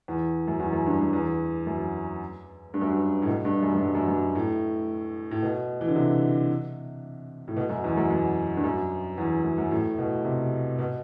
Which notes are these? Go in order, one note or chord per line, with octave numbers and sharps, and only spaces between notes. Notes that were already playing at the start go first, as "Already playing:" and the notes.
E2
F#2
E2
F#2
G2
F#2
E2
F#2
G2
F#2
G2
A2
B2
G2
F#2
F#2
G2
F#2
F#2
A2
A2
B2
E3
D3
C3
A2
B2
F#2
E2
F#2
F#2
G2
F#2
E2
F#2
F#2
A2
B2
C3
B2